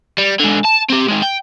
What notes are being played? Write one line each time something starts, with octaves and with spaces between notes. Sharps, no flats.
G3
G#2 D3
A5
C4 G4
D#3 G#3
G5